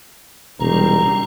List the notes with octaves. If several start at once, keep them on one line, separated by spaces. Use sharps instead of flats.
E1 C3 D#3 G3 C#4 A#5